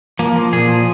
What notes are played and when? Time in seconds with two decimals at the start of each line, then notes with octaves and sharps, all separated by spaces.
0.19 F3 A#3
0.35 F3
0.53 A#2 G#4
0.69 F3